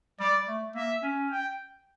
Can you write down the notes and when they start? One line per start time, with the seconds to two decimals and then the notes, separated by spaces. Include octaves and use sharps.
0.20 G3 D5
0.48 A3
0.75 A#3 E5
1.02 C#4
1.31 G5